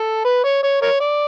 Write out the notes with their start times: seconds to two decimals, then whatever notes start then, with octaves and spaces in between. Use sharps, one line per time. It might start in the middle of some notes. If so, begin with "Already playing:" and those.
Already playing: A4
0.24 B4
0.44 C#5
0.63 C#5
0.82 A#4 C#5
1.00 D5